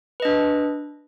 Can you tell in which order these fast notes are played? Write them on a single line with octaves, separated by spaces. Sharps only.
B4 D#5 D4